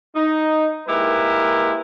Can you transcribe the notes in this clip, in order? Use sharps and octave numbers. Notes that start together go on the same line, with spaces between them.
D#4
G#3 A#3 E4 G4 A#4 B4